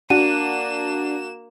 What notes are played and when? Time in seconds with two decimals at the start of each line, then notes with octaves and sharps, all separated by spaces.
0.10 A#3 D4 F#4 D#7 E7